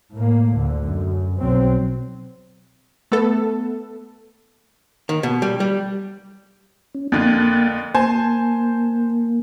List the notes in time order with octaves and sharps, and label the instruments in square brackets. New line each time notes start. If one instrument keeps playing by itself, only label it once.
[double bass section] A2 A#3
D2 D3
F#2
B1 B2 F#3 C4
[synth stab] A3 B3 A4
[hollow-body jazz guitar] D#3
B2
G3
G3
[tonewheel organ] C#4
[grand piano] F2 D3 [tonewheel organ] A#3 F#6 A6
[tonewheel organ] A#3 [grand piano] C5 G#5 A5